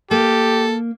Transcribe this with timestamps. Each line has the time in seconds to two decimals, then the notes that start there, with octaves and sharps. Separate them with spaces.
0.11 A#3 G4 A4